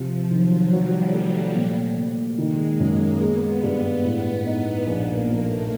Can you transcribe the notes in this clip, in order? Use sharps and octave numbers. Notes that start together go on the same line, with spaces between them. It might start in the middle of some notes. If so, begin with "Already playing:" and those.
Already playing: C3 F3
D#3 F#3
F#3 G3
A3
A#2
A#2
D#3 G#3
F#2 A#3
G#3 B3
G2
A2
D#4
A#1 A#3
F3 A3